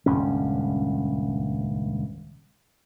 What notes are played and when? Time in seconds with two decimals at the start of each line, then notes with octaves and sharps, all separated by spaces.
0.06 D#1 C#2 G2 C#4